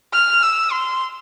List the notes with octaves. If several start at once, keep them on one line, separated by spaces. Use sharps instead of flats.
F6
E6
C6